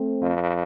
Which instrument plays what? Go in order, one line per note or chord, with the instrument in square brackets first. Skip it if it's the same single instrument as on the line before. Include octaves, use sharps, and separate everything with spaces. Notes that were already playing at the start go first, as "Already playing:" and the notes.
Already playing: [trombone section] A3 C4
[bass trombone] F2